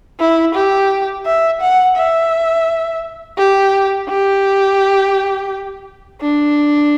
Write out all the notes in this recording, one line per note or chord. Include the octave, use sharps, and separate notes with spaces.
E4
G4
E5
F#5
E5
G4
G4
D4